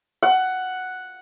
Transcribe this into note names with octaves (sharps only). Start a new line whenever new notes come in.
F#5